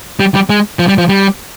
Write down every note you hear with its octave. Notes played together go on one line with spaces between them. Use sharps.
G3
G3
G#3
F3
G3
F3
G3